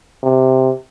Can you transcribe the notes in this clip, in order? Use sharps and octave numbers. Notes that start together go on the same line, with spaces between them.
C3